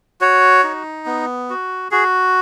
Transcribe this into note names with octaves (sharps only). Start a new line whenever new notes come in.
F#4 C#5
D#4
B3
F#4
F#4 G#4